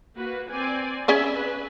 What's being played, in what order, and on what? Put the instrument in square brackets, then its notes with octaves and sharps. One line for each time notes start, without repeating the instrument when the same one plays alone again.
[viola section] A#3 F#4 B4
C4 D5 G#5
[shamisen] C#4 G#4 D5 [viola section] E5 B5
[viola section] B4